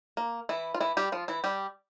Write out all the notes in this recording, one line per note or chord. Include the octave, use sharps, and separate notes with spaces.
A#3
E3 E4
F4
E3 E4
G3 G4
F3 F4
E3 E4
G3 G4